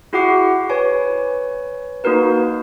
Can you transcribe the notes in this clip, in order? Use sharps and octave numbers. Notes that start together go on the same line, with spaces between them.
E4 F#4 G#4 F#5 D6 C7
B4 C#5 G#5
A#3 D#4 F#4 A#4 B4